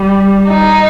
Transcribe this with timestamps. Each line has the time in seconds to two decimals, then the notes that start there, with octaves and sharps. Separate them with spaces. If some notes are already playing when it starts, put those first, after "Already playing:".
Already playing: G3
0.48 D#4